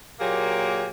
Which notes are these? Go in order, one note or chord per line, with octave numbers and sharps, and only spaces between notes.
A#2 F#3 A#3 G4 G#4